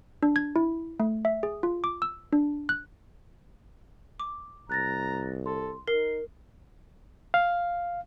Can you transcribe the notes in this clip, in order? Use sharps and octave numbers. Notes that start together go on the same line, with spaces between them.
D4
G#6
E4
A3
E5
G#4
F4
D6
E6
D4
F#6
D6
C2 A#5 F#6 A6 A#6
A4 C6
D#4 A#4 C7
F5